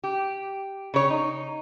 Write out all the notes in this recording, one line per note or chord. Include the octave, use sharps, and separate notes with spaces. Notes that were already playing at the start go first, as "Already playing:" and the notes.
G4
C#3 C#5
D#4